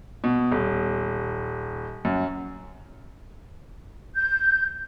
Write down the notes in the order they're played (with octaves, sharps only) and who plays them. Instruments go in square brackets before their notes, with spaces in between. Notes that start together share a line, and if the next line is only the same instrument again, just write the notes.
[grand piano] B2
D#1
F#2
[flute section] G6